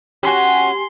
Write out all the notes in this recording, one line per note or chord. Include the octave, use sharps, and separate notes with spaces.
C#4 F#4 G4 G#5 C6